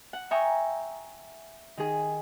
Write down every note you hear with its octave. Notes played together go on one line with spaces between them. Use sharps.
F#5
E5 G5 G#5 A#5 C#6 D#6
D#3 G#4